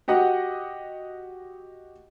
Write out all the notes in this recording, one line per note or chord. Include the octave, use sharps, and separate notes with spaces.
F#4 G4 D#5 F#5